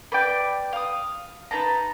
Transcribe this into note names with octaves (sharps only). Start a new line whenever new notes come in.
B4 D5 G5
F5 D#6
D#4 B4 A5 A#5